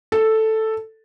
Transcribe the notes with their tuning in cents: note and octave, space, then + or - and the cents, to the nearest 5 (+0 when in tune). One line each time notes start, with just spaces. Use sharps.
A4 +0